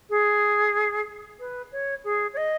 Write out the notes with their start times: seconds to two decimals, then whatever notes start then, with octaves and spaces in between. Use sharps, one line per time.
0.10 G#4
1.39 B4
1.72 C#5
2.04 G#4
2.33 C#5
2.37 D#5